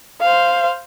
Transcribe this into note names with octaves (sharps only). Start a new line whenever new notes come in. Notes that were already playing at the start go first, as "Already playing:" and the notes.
C5 F5